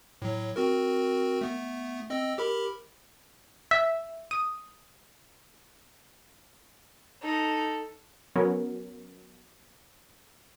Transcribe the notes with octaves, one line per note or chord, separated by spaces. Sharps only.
A2 F#3
C4 F#4 A#4
A3 B3
C4 D#5 E6
G4 A#4 B5
E5
D#6
D#4 A4
F#3 B3 C#4 A#4